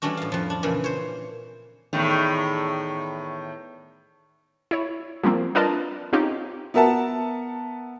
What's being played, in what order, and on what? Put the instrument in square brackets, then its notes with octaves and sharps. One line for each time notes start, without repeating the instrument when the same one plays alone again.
[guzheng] E3 G3 A3 C#4 D4 F#4
A2 F5
F2 F3
D4
A#2 C#3 E3
C5 C#5
[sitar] E2 A2 D#3
[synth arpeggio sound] E4 C#5
F3 G3 A#3 C4
D4 F4 A#4 B4 D#5 A5
C4 C#4 D#4 F4 G4
[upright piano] B3 A#4 E5 F#5 A5